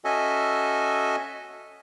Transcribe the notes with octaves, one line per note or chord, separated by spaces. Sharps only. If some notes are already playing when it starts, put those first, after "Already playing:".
C#4 F#4 A4 D#5 E5 G#5